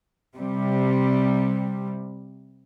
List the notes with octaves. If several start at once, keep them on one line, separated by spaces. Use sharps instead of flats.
C3 G3